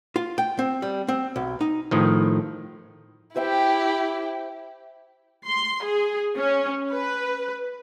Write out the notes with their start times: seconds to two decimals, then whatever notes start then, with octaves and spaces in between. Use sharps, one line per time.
0.16 F4
0.38 G5
0.59 C4
0.82 G3
1.08 C4
1.36 B1
1.61 D#4
1.91 A2 D#3 F3
3.36 E4 G4 C5 E5 G5
5.46 C6
5.84 G#4
6.36 C#4
6.91 B4